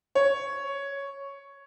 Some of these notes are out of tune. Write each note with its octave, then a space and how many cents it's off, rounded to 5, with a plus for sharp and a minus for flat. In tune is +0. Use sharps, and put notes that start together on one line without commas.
C#5 +5